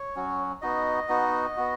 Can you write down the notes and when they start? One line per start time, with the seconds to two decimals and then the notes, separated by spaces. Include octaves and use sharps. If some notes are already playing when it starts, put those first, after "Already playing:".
Already playing: C#5
0.16 F#3 C#4 F#4
0.62 B3 D#4 F#4 D#5
1.09 B3 D#4 F#4
1.57 B3 F#4